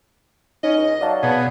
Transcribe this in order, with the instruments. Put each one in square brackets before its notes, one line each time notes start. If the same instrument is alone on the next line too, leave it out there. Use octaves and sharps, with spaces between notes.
[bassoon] C#4 [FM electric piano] D#4 [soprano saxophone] D#5
[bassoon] C#2
[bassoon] F#3 [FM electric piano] D5 F5 A5
[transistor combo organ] B2 G#4 [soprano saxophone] B3